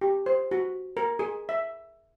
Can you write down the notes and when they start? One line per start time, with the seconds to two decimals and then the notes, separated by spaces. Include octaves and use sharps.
0.01 G4
0.26 C5
0.51 F#4
0.97 A#4
1.19 G#4
1.49 E5